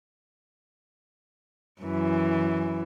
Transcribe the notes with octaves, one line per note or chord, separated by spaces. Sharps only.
F#2 E3